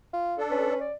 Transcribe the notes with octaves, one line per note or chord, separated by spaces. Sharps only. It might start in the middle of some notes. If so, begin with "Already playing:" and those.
F4
D4 A4
C#4 B4
D5